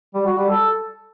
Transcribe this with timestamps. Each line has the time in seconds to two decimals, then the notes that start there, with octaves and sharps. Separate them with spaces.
0.14 G3
0.26 F#4
0.38 G3
0.49 A4